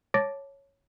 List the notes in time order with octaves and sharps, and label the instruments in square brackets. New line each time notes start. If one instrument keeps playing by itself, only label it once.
[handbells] C#5 A5 D6 A6 A#6 D7